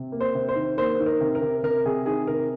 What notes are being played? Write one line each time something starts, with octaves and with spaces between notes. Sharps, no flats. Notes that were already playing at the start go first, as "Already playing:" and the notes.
Already playing: C3
A#3
C5
C3
C5
D#3
A#3 C5
D#3
A#4
C3
A#4
C3
C3 A#4
C3 G#4
D#3 G#4
C3 A#4